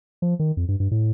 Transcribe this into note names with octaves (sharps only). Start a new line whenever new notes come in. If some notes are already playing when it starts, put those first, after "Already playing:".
F3
D#3
F2
G2
G2
A2